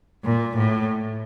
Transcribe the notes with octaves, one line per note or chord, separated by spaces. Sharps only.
A#2
A2